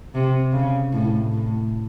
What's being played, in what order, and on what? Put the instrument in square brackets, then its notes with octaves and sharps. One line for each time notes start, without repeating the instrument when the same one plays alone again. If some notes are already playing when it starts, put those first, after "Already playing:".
[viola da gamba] C3
C#3
A2
A2